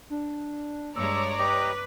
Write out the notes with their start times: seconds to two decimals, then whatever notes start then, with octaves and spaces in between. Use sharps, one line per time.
0.10 D4
0.96 G2 G#3 C#5 D5 A#5 D6 E6
1.39 G4 B4 D#5